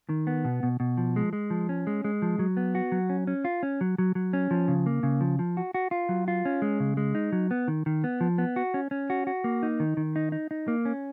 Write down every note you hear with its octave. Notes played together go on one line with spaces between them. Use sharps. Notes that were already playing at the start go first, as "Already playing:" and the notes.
D#3
B3
B2
B2
B2
F3
G#3
G#3
F3
C#4
G#3
G#3
F3
F#3
B3
F#4
F#3
C#4
C#4
F4
C#4
F#3
F#3
F#3
C#4
F3
C#3
A#3
C#3
F3
F3
F#4
F#4
F4
F#3
F4
C#4
G#3
C#3
G#3
D#4
F#3
B3
D#3
D#3
B3
F3
B3
F#4
C#4
C#4
F#4
F#4
A#3
D#4
D#3
D#3
D#4
D#4
D#4
A#3
C#4